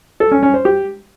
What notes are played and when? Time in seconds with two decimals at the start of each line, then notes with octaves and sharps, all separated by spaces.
0.20 A4
0.31 C#4
0.43 C#4
0.54 C5
0.65 G4